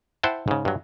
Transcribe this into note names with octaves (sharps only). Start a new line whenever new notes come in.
E4 C5 F#5 G5 A5
G#2 C#3
G2 F#3